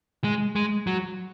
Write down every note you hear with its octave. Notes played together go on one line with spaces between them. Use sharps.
G#3
G#3
F#3